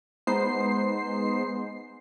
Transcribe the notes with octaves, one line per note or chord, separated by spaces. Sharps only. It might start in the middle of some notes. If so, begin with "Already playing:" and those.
G#3 B3 D#4 C5 C7